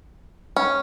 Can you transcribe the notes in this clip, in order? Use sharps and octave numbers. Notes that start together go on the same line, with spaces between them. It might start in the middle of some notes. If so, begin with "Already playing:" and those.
C#4